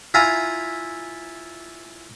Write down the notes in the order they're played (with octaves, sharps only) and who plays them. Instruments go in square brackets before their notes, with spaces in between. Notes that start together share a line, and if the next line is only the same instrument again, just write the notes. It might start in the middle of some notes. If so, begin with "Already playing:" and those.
[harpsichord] E4 F4 G#5 A#5